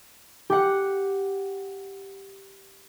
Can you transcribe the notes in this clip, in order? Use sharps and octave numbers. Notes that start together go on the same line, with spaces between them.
G4 F#5